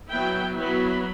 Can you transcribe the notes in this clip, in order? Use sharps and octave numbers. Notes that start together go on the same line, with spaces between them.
F#3 B3 E4 G5
F#3 B3 E4 B5